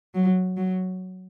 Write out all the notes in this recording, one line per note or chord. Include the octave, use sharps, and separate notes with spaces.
F#3
F#3